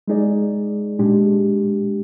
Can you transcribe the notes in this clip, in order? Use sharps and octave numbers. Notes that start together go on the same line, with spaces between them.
G#3 D#4 G#4 D5
A#2 G#3 D4 G4